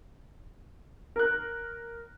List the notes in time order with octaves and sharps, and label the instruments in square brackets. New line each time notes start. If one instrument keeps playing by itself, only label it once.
[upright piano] A#4 F#6